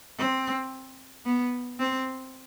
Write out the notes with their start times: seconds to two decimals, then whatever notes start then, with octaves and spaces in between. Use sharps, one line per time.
0.19 C4
1.26 B3
1.80 C4